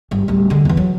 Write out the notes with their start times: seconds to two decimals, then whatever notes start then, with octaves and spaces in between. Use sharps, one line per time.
0.11 G1 G3
0.28 D1 G3
0.50 D3 G#3
0.65 E2 E3
0.77 F#3